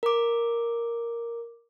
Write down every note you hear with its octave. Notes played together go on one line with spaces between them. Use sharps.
A#4 D6